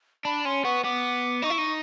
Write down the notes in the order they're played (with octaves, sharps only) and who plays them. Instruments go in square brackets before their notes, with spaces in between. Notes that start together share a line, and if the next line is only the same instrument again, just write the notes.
[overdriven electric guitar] D4 [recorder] B5
[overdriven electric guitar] C#4 [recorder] C6
[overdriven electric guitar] B3 [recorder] C#6
[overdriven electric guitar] B3 [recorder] D6
[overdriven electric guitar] D#4 [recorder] D6
[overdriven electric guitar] E4 [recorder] C#6
[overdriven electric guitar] D#4